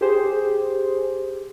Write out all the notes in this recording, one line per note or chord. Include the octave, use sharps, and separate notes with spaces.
G4 G#4 C5